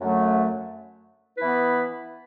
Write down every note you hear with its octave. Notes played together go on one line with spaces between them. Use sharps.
F#2 D3 F#3 A3
E3 B3 E4 B4